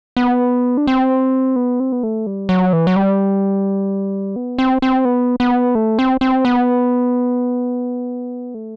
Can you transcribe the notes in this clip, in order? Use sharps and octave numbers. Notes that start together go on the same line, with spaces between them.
B3
D4
C4
B3
C4
B3
A3
G3
F#3
E3
F#3
G3
B3
C4
C4
B3
B3
A3
C4
C4
B3
A3